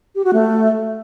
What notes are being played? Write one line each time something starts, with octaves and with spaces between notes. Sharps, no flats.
G4
F#4
A3